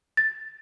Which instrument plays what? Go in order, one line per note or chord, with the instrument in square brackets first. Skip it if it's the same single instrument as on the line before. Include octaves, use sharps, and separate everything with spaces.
[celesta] A6